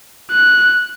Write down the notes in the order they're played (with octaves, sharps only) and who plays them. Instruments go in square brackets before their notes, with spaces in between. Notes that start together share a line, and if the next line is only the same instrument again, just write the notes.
[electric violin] F#6